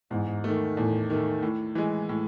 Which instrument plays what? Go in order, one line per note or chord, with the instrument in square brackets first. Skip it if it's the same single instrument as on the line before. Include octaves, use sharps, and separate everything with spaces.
[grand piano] E2 [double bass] G#2
[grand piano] D#3 A3
[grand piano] E2 [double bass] A2
[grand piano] D#3 A3
A2
E3 G#3
A2